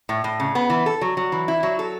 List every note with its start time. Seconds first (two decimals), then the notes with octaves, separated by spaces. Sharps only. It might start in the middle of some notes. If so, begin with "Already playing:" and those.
0.09 A2
0.24 A2
0.40 C#3
0.55 B3
0.70 E3
0.86 A4
1.01 F#3
1.17 F#3
1.32 E3
1.48 E4
1.63 F#3
1.79 A4